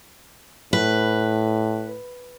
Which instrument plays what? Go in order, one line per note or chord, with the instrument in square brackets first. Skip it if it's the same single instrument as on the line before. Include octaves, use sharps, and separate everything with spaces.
[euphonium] A2 [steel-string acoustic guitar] B4